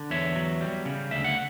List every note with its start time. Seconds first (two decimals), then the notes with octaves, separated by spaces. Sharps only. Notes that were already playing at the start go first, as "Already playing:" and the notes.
Already playing: D3
0.11 E2 C#5 E5
0.36 F#3
0.61 G3
0.85 C#3
1.11 D2 E5
1.24 F#5